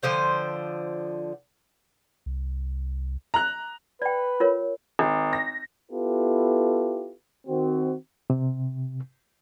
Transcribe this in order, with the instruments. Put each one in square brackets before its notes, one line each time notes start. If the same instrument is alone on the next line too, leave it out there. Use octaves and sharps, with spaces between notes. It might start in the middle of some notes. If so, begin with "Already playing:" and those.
[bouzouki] D3 F3 C5 G5
[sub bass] C2
[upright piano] A#5 F#6
[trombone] B4 [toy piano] D5 G5
[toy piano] F4 A#4 C#5
[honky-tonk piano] G#1
A#6
[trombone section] B3 E4 F4 G4 A4 B4
D#3 C4 F#4
[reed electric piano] C3